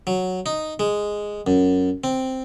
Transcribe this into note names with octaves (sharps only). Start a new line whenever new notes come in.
F#3
D#4
G#3
F#2
C4